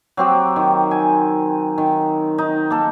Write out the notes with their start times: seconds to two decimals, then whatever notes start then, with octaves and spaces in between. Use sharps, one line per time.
0.17 F#3 C4 G4
0.56 D#3
0.91 G#5
1.78 D#3
2.38 D#4
2.70 A#3 A4